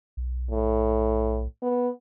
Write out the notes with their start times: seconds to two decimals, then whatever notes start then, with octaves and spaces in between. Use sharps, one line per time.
0.17 B1
0.51 A2
1.62 B3